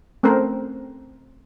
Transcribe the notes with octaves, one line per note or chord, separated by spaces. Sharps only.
A3 C4 C#4 A4 A#4 C5